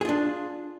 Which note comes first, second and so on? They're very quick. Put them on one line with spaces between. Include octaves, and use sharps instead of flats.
G#4 F4 D4